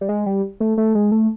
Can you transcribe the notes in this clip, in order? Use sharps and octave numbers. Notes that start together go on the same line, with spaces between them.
G3
G#3
G3
A3
A3
G#3
A3